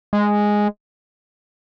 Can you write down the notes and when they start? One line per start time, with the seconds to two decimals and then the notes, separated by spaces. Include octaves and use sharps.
0.13 G#3